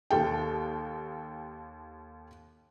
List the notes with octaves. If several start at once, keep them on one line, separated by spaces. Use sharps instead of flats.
D#2 A4 G5